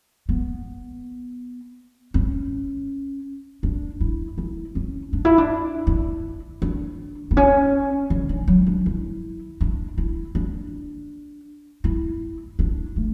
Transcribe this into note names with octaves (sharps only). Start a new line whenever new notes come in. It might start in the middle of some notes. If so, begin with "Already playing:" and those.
B3
C#4
D4
E4
E4
C#4
D4
E4
D4
E4
D4
B3
C#4
D3
D3
F#3
D4
E4
D4
E4
D4
E4
D4
A3